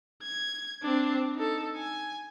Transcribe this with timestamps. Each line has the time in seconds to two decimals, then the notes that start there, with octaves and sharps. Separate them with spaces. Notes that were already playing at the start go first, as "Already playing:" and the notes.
0.22 G#6
0.82 C4 D4
1.36 D#4 A4
1.76 G#5